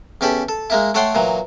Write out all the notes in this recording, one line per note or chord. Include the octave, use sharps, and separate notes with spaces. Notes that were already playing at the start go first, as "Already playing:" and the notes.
E2 C#4 G4 A4 B5
A4
G#3 A#3 E4
A3 A4 C#5 F#5 G5 C6
A#2 E3 F#3